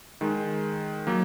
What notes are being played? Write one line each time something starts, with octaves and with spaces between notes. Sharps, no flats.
D#3 G#3
F#3 A#3